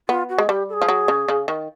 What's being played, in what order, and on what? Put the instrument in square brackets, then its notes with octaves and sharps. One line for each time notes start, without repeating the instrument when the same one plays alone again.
[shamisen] B3 [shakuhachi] F4
[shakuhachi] F#4
[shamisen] G#3
[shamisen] G3 [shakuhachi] G4
[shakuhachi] A4
G#4
[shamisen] F3
F#3
C#3
C#3
D#3